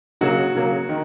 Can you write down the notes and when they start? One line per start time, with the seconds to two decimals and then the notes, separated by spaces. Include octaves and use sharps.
0.21 C#3 F#3 A#3 F#4
0.55 C#3 F#3 A#3
0.89 D#3